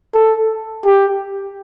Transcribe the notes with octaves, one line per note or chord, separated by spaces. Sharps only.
A4
G4